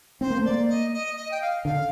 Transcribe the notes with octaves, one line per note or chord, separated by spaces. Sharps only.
C4 C5
A#3
A3
A#3 D5
D#5
D#5
D#5
G5
F5
D3 F5